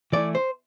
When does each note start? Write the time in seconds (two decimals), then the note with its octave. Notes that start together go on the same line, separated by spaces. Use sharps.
0.13 E3 A3 E4 D5
0.35 C5